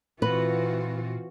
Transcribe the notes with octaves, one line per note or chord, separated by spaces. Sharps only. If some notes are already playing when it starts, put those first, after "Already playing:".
A#2 E3 C4 F4 F#4 B4